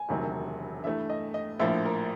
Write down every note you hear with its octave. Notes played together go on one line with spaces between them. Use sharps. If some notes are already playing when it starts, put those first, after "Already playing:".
Already playing: G#5
E1 D2 C3 D#3 F#3
G2 E3 A3 E5
D#5
D#5
A#1 A2 F3 A#3 E5
A#4